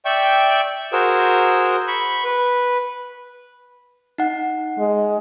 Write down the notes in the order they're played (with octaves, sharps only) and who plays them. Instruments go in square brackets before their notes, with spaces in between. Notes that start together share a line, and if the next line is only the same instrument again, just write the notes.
[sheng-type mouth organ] D5 E5 G5 C#6 E6
F#4 G#4 A#4 C5 E6
B5 C#6
B4
[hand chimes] D#4 F#5
[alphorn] G#3